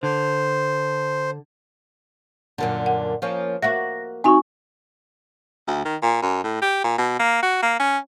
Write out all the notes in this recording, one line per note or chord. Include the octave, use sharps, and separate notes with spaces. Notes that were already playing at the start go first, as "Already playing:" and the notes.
D3 C5
F#2 A#2 D3
F#5
F3 A#3 C#4
A#3 F#4 E5 A#6
C4 D#4 E4 F#4 G#5 C#6
D2
D#3
A#2
F#2
A2
G4
A#2
B2
A#3
F#4
A#3
C#4